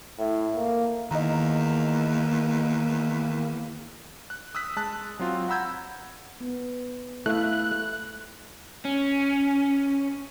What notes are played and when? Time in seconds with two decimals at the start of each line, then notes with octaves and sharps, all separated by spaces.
0.19 A2
0.56 A#3
1.11 E2 D#3 A#3 D#5 A#5
4.30 F#6
4.55 D#6 E6 F#6 B6
4.76 G#3 A5 F#6
5.19 F#3 C4 F4
5.48 F#5 A#5 B5 E6 G6 G#6
6.41 B3
7.26 A3 E4 E5 F5 F#6
8.85 C#4